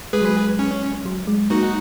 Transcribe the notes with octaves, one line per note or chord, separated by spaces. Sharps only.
G#3 G#4 B4
F#3
G#3
C#4
F#3
G#3
A#3 D#4 F#4